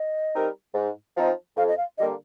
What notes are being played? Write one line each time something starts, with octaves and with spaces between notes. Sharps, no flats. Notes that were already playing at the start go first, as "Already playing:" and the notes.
Already playing: D#5
G3 C4 D#4 A#4
G#2
F3 C4 D#4
F2 F5
D#5
F5
D3 G3 A#3 D#5